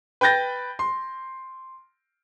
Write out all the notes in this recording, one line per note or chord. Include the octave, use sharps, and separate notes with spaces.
B4 G5 B5 G6 A6 A#6
C6